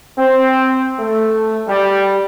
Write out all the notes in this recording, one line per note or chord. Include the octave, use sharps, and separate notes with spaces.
C4
A3
G3